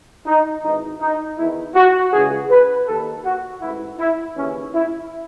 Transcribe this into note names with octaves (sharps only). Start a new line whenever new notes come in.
D#4
G#1 G#2 E3 D#4
D#4
E2 D#3 E4
F#4
C#2 C#3 E3 G#4
B4
D#2 D#3 A4
F#4
A1 G#2 E3 E4
E4
D#2 C#3 E3 C#4
E4